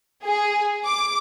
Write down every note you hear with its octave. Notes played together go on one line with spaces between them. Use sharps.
G#4
D6